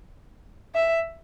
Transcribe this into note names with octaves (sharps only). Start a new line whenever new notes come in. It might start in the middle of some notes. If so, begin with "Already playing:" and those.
E5